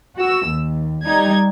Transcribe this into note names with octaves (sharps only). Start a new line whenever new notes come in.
F#4 E6
D#2
G3 D#4 G#6